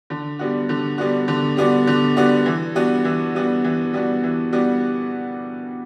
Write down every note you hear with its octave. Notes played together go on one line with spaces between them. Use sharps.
D3
G3 B3 D4 F#4
D3
G3 B3 D4 F#4
D3
G3 B3 D4 F#4
D3
G3 B3 D4 F#4
E3
G3 B3 D4 F#4
E3
G3 B3 D4 F#4
E3
G3 B3 D4 F#4
E3
G3 B3 D4 F#4